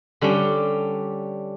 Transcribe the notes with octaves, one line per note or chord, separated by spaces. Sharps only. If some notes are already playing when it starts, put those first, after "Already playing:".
D3 G3 C#4 D4 G4